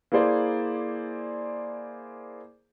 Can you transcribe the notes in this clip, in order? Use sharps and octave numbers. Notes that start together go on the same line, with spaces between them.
A#3 E4 G#4 C5 D5